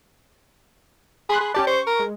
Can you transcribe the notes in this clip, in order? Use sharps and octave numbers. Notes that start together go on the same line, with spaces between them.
G#4 B5 C6 F#6
G#4
C#4 G4 D5 A5
C5 C#6
A#4
G#3